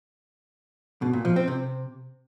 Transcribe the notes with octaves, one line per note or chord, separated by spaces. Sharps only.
B2
A#2
F3
C4
C3